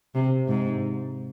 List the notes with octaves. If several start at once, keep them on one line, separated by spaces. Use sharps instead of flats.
C3
G#2